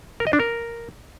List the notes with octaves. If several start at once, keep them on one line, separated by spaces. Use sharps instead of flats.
A#4
D#5
D4
A#4